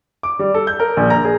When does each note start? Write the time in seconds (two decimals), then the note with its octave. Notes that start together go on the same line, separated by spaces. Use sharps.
0.23 D6
0.39 G3
0.54 A4
0.67 G6
0.80 A#4
0.97 A#1
1.10 A#5
1.25 G#4